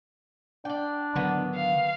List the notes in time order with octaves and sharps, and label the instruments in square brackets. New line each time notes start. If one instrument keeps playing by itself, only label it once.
[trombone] D4 [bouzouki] D5 G5
[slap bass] D3 F#3 [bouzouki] D#3 B3
[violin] F5